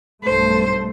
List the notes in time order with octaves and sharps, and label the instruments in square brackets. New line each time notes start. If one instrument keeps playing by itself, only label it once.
[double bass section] B1 G2 A3 [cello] C5